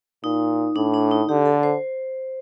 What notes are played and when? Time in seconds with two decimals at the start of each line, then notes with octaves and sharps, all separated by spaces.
0.23 A#2 D#4
0.76 A2 D4
0.94 D4
1.11 D#4
1.28 D3 G4
1.45 A4
1.63 C5